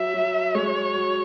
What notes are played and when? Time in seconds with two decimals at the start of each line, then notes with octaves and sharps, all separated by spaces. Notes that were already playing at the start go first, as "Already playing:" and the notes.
Already playing: F#3 E5
0.14 F#3
0.55 G#3 C#5
0.95 F#3